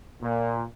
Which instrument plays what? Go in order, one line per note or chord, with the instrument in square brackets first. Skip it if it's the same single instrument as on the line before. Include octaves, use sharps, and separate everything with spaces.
[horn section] A#2